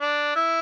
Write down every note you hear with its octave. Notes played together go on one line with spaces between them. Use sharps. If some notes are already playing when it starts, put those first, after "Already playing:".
D4
E4